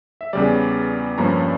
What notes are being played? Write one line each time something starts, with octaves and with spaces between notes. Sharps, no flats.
E5
E2 C#3 G3 D5
G2 F3 A#3 C#4 A#5